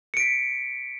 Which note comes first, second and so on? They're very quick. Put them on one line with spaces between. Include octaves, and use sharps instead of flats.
C#7 D7 B6